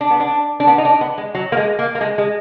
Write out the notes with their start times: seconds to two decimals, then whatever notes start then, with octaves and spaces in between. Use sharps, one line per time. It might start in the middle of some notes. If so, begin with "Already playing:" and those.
0.01 D4
0.11 B3
0.20 D4
0.60 D4
0.67 B3
0.78 D#4
0.85 D4
1.01 B3
1.18 G#3
1.35 F#3
1.52 A#3
1.57 G#3
1.79 A#3
1.95 A#3
2.01 G#3
2.18 G#3